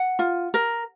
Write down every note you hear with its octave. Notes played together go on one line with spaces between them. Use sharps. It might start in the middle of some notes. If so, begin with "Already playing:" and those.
Already playing: F#5
F4
A#4